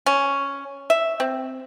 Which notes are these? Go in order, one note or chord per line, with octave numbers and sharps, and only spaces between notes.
C#4
E5
C4